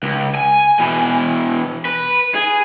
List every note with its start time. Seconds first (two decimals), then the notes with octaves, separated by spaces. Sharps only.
0.03 C#2
0.34 G#5
0.79 B2 E3
1.85 B4
2.35 G#4